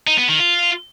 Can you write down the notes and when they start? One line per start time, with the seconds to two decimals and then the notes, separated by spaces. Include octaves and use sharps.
0.07 D#4
0.18 B3
0.29 D#3
0.40 F4